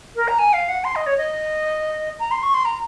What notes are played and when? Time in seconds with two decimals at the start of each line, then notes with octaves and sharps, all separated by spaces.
0.16 A#4
0.28 A#5
0.39 G#5
0.53 F5
0.69 F#5
0.84 C6
0.96 D#5
1.07 C#5
1.18 D#5
2.20 A#5
2.31 C6
2.43 C#6
2.54 C6
2.65 A#5